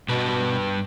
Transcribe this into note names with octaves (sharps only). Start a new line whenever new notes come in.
G2 B2 B4 A5